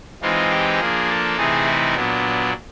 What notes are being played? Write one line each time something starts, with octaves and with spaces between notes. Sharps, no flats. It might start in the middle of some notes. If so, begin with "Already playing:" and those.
E3 G#3 C4 D#4 F4
G4
F3 A#3 D4 G#4
A4
C3 E3 A3 C4 D#4 G#4
E4
A#2 F#3 B3 D4